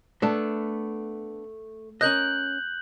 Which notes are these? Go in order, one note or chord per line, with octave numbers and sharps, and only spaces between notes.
A3 B3 D4
C#4 A#4 D#5 F#6 G6 F#7